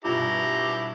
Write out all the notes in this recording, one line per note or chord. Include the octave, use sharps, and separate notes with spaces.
G2 B2 E4 F4 G4 A#5